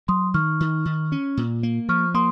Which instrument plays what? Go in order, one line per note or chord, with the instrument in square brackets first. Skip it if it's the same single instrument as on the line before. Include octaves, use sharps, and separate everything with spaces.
[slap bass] F#3 [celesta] C6 D#6
[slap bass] D#3 [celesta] C#6 F6
[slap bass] D#3
D#3
C#4
A#2
A#3
[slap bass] F3 [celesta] C#6 F6
[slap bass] A#3 [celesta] C6 D#6